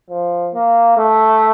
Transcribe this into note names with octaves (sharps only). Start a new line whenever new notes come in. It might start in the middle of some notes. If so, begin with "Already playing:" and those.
F3
A#3
A3